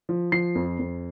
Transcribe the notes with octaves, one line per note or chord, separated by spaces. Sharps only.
F3
F3 C7
F2
F2